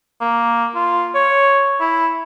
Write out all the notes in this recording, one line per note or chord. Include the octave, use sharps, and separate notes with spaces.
A#3
F4
C#5
E4